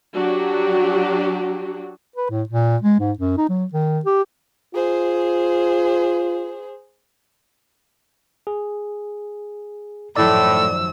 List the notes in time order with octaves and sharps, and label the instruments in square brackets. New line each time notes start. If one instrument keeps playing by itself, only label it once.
[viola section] F#3 D4 F#4 G4
[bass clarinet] B4
A2
A#2
G#3
G#2
F#2
D#4
F#3
D#3
G4
[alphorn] F4 [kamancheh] G#4 C5
[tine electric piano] G#4
[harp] G#1 F#2 F3 [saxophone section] A2 [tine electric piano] D5 [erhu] E6